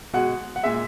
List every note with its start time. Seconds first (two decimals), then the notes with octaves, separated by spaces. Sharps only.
0.13 B2 G#3 F#5
0.56 F#5
0.63 A#2 G#3 E5